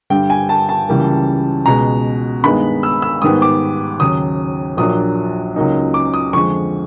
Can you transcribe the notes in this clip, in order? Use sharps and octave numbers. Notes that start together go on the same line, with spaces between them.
G2 D3 G3 G5
G#5
A5
A5
C#2 C#3 E3 G3 A#3
C#2 B2 G#3 A#5
G2 D#3 G#3 B3 D#4 B5
E6
E6
G#2 D#3 G3 B3 D#6
D6
D#2 C#3 F#3 D#6
A#1 A#2 F#3 A#3 D4 D#6
C#2 C#3 F#3 A#3 D#4
D6
D#6
F2 D3 F3 G#3 C#6